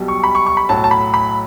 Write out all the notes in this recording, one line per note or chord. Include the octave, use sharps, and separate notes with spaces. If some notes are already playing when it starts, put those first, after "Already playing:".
Already playing: B1 B2 G3
C#6
B5
C#6
C#6
B5
B1 A2 F#3 A5
A5
B5
B5